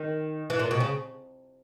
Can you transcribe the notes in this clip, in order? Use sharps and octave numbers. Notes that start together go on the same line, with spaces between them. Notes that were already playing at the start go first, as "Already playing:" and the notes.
Already playing: D#3
E3
A#2
B2
C#3